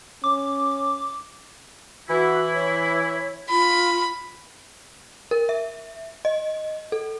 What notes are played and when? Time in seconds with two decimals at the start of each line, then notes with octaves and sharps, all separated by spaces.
0.24 C#4 D6
2.09 E3 E4 F#4
2.54 C#5
3.49 F4 B5
5.31 A#4
5.49 E5
6.25 D#5
6.92 A4